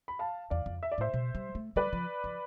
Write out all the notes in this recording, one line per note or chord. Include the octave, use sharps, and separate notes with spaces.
B5
F5 A5
E2 D5 F5
F2
E5
D5
A2 C5 E5
B2
G3
A3
G3 B4 D5
F3
F3